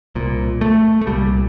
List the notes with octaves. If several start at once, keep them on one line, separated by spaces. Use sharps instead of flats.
C2 A#2
A3
A3
C2 A#2 G3